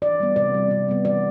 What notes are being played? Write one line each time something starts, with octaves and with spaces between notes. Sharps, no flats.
E3 D5
G3 B3
C3 D5
G3 C4
C3
G3 B3
E3 D5